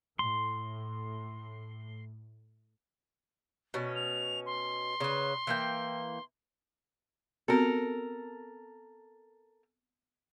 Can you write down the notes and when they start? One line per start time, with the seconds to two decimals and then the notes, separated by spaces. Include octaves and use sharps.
0.19 A2 C6
3.74 B2 C#4
3.96 F7
4.46 C6
5.00 C#3 B4
5.47 E3 A#3 G5
7.48 B3 C4 F#4 A4 A#4